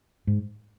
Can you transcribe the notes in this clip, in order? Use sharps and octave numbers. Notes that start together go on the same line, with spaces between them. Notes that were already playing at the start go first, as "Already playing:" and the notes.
G#2